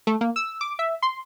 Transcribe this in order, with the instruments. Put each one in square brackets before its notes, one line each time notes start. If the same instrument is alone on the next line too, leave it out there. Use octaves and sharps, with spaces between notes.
[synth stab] A3
A#3
E6
D6
E5
C6